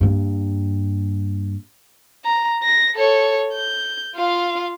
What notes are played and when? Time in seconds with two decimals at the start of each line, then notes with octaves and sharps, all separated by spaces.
0.01 G2 A#3
2.25 A#5
2.63 A#6
2.95 A4 C#5
3.53 G6
4.15 F4 F5